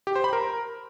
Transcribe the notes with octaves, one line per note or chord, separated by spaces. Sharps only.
G4
C5
B5
A#4